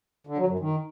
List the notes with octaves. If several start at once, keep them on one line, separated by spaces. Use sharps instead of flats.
D3
F#3
F#2
D#3